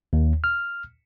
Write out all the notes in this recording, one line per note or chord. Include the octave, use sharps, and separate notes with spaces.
D#2
F6